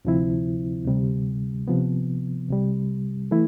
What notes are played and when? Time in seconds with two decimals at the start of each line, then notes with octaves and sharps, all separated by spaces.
0.05 D2 C3 F3 C4 E4
0.85 D2 C3 G3
1.68 C3 F3 B3
2.48 C2 C3 G3
3.31 E3 A3 E4